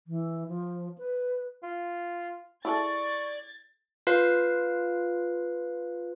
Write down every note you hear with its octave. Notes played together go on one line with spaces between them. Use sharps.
E3
F3
B4
F4
E4 G#4 A4 D5 C#6 G#6 A6
F4 B4 F5